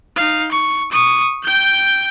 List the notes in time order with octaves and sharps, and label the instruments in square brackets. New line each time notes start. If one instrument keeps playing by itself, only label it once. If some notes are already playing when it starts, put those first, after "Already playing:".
[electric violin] D#4 F5
C#6
C#6 D#6
G5 G6